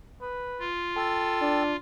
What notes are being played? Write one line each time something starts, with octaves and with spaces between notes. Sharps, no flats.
B4
F4
A4 G5 E6 A6
D4